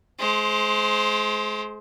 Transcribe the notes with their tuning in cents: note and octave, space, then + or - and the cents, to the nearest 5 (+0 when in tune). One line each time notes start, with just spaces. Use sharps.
G#3 +35 C5 +0